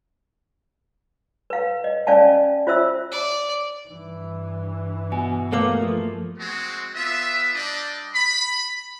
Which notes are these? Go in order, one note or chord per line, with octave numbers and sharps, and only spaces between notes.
B4 F5
D#5
C#4 D5 F5 G#5 A5
F4 C5 E5 E6
D5
G2 E3
B3 F#4 G#5
A3 A#3 G#4 B4 D6
F3 A4
G#3 C4 F#4
B3 F4 E5
G3 D4 D5 D#5
B5